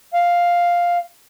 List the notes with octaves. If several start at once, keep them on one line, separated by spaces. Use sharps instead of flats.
F5